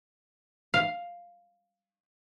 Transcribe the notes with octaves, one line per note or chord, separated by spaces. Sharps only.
F5